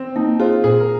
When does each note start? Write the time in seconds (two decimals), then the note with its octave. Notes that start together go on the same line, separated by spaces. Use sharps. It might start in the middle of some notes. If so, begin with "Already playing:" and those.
Already playing: C4
0.16 A#3 D#4
0.40 F4 G#4 C5
0.64 A#2 G#4
0.80 A#4